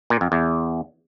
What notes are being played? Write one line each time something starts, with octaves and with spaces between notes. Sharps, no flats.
A#2
F2
E2